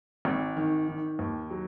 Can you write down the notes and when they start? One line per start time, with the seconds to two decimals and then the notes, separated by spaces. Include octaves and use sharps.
0.25 G#1
0.57 D#3
0.88 D#3
1.19 D#2
1.50 F#3